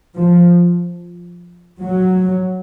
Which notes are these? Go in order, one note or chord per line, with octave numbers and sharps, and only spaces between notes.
F3
F#3